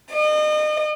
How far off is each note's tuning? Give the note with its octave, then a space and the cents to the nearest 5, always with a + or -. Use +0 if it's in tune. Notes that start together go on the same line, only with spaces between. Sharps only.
D#5 -35